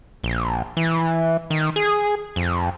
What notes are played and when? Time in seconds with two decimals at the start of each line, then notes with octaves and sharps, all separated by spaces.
0.24 A#1
0.77 E3
1.50 D#3
1.76 G#4
2.36 F2